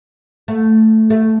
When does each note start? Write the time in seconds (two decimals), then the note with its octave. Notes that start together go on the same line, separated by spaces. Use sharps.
0.48 A3
1.10 A3